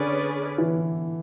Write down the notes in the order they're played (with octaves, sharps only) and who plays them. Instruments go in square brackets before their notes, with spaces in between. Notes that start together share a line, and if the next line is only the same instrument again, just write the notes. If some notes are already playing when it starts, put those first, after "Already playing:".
Already playing: [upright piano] D3 [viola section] C#4 G#4 B4 D5
[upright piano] E3